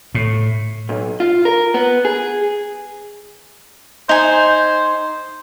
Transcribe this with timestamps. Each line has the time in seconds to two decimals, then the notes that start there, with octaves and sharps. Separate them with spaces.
0.15 A2
0.89 B1
1.20 F4
1.45 A#4
1.74 B3
2.05 G#4
4.09 D#4 C5 G#5